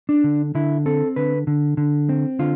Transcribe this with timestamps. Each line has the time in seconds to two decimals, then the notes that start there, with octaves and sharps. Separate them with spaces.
0.09 D4
0.24 D3
0.55 D3 E4
0.86 C4 A4
1.16 D3 B4
1.47 D3
1.77 D3
2.09 C4
2.39 D3 F4